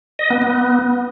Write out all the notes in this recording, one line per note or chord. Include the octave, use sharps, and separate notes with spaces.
D#5
B3
B3